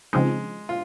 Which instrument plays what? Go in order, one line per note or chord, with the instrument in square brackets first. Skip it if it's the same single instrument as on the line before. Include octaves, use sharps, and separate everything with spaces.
[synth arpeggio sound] C#3 F3 C4 D#4 [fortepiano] G#3
[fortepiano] F4